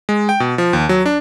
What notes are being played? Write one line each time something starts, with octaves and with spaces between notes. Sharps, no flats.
G#3
G5
B2
F3
D#2
F#3
D4